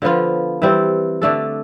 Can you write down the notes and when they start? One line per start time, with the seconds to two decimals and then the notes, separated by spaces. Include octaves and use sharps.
0.02 D3 F3 B3 F4
0.62 E3 G3 C4
1.22 D3 A3 D4 A4